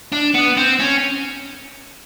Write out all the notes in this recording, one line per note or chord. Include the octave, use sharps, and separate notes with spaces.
D4
B3
C4
C#4